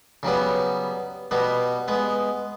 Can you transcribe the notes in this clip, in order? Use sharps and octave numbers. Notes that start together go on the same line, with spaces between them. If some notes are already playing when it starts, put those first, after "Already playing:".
C#3 F#3 G3 B3
B2 G3 B3
G#3 B3